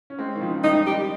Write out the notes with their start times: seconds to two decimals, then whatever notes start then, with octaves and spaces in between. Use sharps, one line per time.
0.10 C#4
0.19 G#3 C4
0.35 D#3
0.41 C#3 F3
0.64 D#3 G3 D#4
0.87 G4